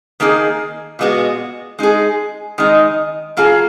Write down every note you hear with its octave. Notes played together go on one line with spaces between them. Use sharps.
D#3 A#3 D#4 G#4
A#2 G#3 B3 F#4
G#3 D#4 G#4
D#3 G#3 D#4
F#3 A#3 F4 G#4